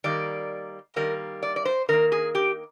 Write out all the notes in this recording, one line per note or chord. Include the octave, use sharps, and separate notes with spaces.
D#3 G3 A#3 D5
D#3 G3 A#3 A#4
D5
D5
C5
D#3 A#3 A#4
G#4
G4